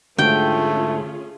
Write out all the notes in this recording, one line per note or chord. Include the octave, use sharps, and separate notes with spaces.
D2 G#2 A3 C#4 F4 G#4 G5